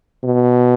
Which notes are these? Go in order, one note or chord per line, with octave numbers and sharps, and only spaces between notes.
B2